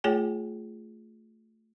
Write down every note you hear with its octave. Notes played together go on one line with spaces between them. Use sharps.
A3 F4 G#4 C#5 G5 G#5